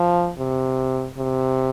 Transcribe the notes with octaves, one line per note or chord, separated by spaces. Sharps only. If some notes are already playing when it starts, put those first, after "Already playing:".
Already playing: F3
C3
C3